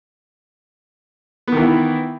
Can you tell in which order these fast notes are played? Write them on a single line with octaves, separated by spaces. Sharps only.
B3 D#3 E3 E4